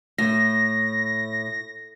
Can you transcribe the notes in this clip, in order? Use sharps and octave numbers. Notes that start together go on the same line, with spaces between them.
A2 A#6